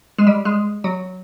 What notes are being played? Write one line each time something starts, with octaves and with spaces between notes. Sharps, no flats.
G#3
G3
G#3
F#3